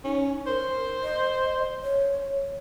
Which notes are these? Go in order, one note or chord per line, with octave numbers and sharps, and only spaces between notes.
C#4 D#4
A#4 C5
D#5
C#5